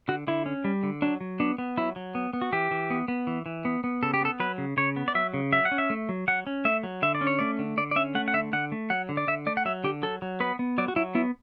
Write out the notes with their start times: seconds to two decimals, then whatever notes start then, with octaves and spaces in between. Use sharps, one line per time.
0.08 D3 F#4
0.27 D3 E4
0.46 C#4
0.64 G3
0.83 D3
1.02 F#3 D4
1.21 F#3
1.40 B3 D4
1.58 B3
1.77 F#3 E4
1.96 F#3
2.15 B3
2.33 B3
2.42 F#4
2.52 E3 G4
2.71 E3
2.90 B3
3.08 B3
3.27 E3
3.46 E3
3.65 B3
3.84 B3
4.03 C#3 A4
4.14 G4
4.21 B3 A4
4.40 F#3 B4
4.58 C#3
4.77 C#3 C#5
4.96 B3
5.08 D5
5.15 F#3 E5
5.34 C#3
5.52 F#3 E5
5.65 F#5
5.72 C#4
5.78 E5
5.90 A3
6.09 F#3
6.28 F#3 F#5
6.47 C#4
6.65 A3 E5
6.84 F#3
7.02 D3 E5
7.15 D5
7.21 C#4
7.27 C#5
7.39 A3 D5
7.59 D3
7.77 D3 D5
7.91 D5
7.96 C#4 E5
8.15 A3 F#5
8.28 F#5
8.34 D3 E5
8.53 D3 F#5
8.72 A3
8.90 F#3 F#5
9.09 D3
9.17 D5
9.28 D3 E5
9.46 A3 D5
9.57 F#5
9.65 F#3 E5
9.84 D3 G4
10.03 F#3 A4
10.22 F#3
10.40 B3 B4
10.59 B3
10.78 F#3 D5
10.88 F#4
10.96 F#3 E4
11.15 B3 E4